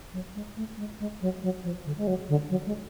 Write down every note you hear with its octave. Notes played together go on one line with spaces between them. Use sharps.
F#3
G#3
A3
G#3
G#3
F#3
F#3
F3
D3
G#3
F#3
D3
F#3
G#3